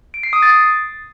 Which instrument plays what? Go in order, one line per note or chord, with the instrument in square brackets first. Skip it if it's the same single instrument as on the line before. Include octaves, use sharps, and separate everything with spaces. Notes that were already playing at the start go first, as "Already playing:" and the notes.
[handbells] D7
C7
D#6
A6